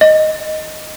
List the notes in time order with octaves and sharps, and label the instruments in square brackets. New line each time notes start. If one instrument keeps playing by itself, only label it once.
[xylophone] D#5